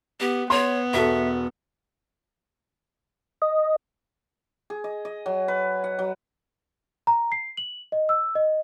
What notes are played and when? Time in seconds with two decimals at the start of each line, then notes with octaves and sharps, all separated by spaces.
0.20 B3 G4
0.50 B3 C#5 C6
0.93 E1 F#4 A4 E5
3.42 D#5
4.70 G#4
4.84 D#5
5.05 D#5
5.26 F#3
5.48 B4
5.84 F#5
5.99 F#3
7.07 A#5
7.32 C7
7.57 F#7
7.92 D#5
8.09 E6
8.35 D#5